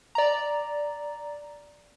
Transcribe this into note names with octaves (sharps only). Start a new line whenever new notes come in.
D5 A#5